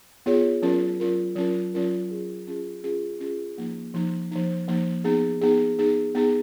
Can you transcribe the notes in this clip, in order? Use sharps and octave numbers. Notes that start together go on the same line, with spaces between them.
B3 F4 G#4 C#5
F#3 C#4 F4 A#4
F#3 C#4 F4 A#4
F#3 C#4 F4 A#4
F#3 C#4 F4 A#4
C#4 F4 G#4
C#4 F4 G#4
C#4 F4 G#4
C#4 F4 G#4
F3 A#3 D#4
F3 A#3 D#4
F3 A#3 D#4
F3 A#3 D#4
B3 D#4 G#4
B3 D#4 G#4
B3 D#4 G#4
B3 D#4 G#4